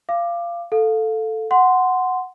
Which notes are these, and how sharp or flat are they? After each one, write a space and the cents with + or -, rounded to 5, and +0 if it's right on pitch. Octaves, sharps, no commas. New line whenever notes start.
F5 -20 D6 +15
A4 +0 F5 +15
F#5 +0 C6 -10